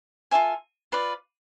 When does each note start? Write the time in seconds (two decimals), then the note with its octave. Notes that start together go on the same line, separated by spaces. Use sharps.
0.31 F4 A4 E5 G#5
0.92 F4 B4 D5